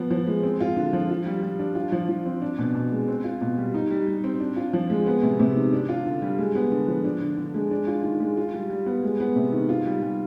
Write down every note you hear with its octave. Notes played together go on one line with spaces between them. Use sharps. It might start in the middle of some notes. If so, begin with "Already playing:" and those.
Already playing: F3 B3
F3
G#3
C4
F4
D3
F3
F4
G3
G3
D4
F4
F3
F3
C4
D4
B2
B2
G#3
C4
F4
B2
G3
D#4
G3
G3
C4
D4
F4
F3
G#3
B3
C3
C3
D#3
D4
F4
D3
G3
G#3
B3
D3
F3
D4
D3
D3
G#3
D4
F4
D#3
G#3
F4
G3
G3
B3
G#3
B3
C3
D#3
F4
G3
G3